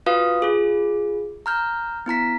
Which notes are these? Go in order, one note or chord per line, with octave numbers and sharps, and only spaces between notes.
F4 F#4 B4 F5 D#6
F4 G#4
A#5 F6 G6
B3 E4 A#5 B6